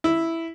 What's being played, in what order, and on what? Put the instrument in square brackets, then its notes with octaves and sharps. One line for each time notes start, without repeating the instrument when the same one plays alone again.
[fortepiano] E4